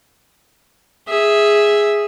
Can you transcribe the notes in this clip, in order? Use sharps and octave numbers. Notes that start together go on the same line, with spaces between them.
G#4 E5